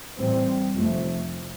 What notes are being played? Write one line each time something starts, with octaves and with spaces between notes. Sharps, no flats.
A1 A2 G3 C4
F1 F2 F3 A3